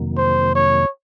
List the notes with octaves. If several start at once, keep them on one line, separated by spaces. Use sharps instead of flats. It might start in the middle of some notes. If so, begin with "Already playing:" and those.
Already playing: F2 C3 D#3 F#3 A#3
C5
C#5